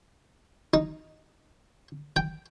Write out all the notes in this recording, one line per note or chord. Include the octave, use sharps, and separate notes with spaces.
D#4
G5